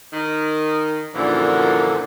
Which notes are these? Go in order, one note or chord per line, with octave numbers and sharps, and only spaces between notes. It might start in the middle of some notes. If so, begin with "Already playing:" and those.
D#3
F#2 A#2 D3 E3 F3